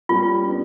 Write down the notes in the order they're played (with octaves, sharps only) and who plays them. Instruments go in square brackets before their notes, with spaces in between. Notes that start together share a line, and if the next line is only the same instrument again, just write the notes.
[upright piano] G3 A#3 C#4 [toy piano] F4
[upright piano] B3 D4